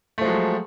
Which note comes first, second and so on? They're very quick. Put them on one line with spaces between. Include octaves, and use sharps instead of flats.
A3 F3 G#3 F#3